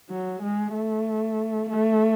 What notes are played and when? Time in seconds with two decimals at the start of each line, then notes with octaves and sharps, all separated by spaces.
0.10 F#3
0.42 G#3
0.74 A3
1.69 A3